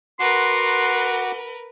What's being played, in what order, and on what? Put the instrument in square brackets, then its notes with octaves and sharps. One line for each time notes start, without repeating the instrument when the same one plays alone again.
[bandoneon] F#4 F#5 D6 [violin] A#4 B4 [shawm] C6